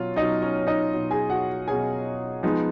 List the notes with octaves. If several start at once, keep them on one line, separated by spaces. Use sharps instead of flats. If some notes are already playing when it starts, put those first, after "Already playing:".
Already playing: B2 F#3 C#4 F4
B2 F#3 C#4 D#4 D#5
C#4 C#5
D#4 D#5
B2 F#3 C#4
G#4 G#5
F#4 F#5
B2 F#3 C#4 G#4 G#5
F3 G#3 B3 D#4